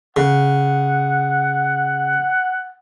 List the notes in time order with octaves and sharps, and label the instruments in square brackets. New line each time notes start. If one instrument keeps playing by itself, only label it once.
[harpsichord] C#3 [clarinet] F#5